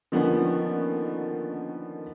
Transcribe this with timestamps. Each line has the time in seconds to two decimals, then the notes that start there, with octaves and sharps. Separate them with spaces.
0.12 D3 D#3 F3 A#3 B3 C#4